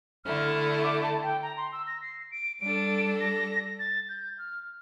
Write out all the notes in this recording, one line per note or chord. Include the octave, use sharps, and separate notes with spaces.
D3 A3 E4 F6
D6
A5
G5
A#5
C6
E6
A#6
C7
D7
G3 D4 A4 D7
A#6
A6
G6
F6